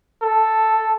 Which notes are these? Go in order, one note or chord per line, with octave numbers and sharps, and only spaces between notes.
A4